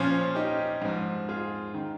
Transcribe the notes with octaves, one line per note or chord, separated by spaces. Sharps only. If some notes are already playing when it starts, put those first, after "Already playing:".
Already playing: A#2 F3 C#4 F4
D#4 G4
G#2 F3
F4 G#4
D#3